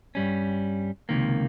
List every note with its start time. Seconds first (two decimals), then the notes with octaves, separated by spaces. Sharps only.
0.15 G2 G3 C#4
1.09 C#2 C3 D#3 A#3